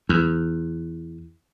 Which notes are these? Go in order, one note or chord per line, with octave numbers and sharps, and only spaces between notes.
E2